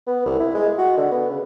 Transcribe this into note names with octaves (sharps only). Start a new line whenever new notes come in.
B3
C2
E4
G#3
F#4
D3
B3
C#3